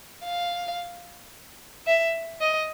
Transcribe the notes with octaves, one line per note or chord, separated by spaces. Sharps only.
F5
E5
D#5